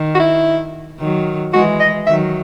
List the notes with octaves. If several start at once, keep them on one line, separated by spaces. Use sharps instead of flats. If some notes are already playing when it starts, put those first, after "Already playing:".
Already playing: D#3
F#4
E4
D#3 F#3
E3 G#3 F#4
D#5
D#3 F#3 E5